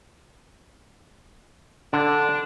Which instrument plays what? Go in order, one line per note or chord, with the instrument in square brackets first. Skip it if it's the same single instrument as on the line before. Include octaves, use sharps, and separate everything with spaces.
[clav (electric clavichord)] D3 [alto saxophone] D4